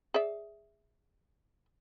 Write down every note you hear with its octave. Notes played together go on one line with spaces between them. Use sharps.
G#4 D5 E5